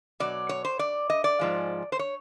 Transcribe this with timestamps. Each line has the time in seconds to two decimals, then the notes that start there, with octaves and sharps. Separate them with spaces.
0.20 B2 F#3 D5
0.49 C#5
0.65 C5
0.79 D5
1.10 D#5
1.24 D5
1.39 G#2 F3 G#3
1.92 C5
1.99 C#5